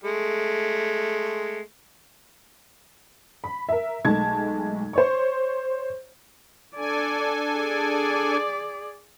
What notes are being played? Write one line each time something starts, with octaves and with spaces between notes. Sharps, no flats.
G#3 A3
B5
A#4 E5
B1 G#3 A3 A5 G#6
C5 C#5 C#6
D4 A4 D5 G#5
G#4 D5